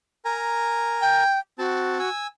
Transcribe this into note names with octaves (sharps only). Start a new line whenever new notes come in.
A#4 G#5 A#5
G5
C4 F#4 A5
G#5 E6